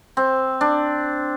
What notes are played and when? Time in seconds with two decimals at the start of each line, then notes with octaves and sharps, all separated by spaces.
0.17 C4
0.61 D4